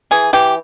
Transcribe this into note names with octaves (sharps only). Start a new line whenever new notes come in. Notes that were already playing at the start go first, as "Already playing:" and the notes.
E3 G#4
E3 G4